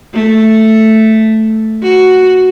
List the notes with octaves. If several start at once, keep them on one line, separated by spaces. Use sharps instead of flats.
A3
F#4